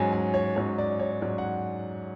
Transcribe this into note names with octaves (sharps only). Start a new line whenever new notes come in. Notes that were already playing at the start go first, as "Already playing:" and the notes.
Already playing: G#2 F#3 C#4 G#5
G#5
C#5
G#2 F#3 C#4 C#5
D5
C#5
G#2 F#3 C#4 D5
F#5